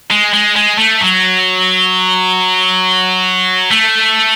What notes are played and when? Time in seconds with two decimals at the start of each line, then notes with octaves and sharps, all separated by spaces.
0.11 G#3
0.34 G#3
0.56 G#3
0.78 A3
1.01 F#3
3.71 A3